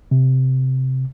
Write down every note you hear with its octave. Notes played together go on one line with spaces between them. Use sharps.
C3